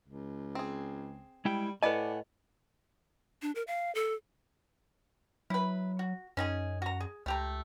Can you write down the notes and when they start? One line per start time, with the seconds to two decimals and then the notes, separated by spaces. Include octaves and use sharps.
0.08 C#2
0.55 C4 G#4
1.45 G3 G#3 E4 G5
1.83 A2 A4 B4 D5 D#5 F#5 G#5 B5
3.42 D4
3.55 A#4
3.67 F5
3.95 A4
5.50 F#3 E4 B4
5.99 F#4
6.37 F#2 C#4 D#4 G#4
6.82 F#4 A#5
7.01 G#4
7.26 C#2 A3 G4 A#5